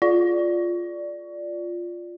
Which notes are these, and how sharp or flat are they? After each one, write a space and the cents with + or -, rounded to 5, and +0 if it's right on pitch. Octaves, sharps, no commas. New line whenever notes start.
F4 +0 D5 +0